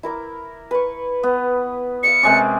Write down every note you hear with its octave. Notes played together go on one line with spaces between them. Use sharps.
E4 A#4 D6
B4 C#6
B3
D5 E5 F5 C#7
C3 G#3 C#4 A#4 D5